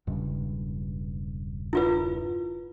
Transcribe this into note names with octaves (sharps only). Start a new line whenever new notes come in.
E1 G2 C#3
E4 F4 B4